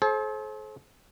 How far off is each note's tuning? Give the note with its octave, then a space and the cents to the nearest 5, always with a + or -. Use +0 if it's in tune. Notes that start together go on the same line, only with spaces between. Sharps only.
A4 -45 C5 +30